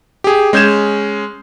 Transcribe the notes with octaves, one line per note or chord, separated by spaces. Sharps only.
G4 G#4
G#3 C#4 G6 G#6 E7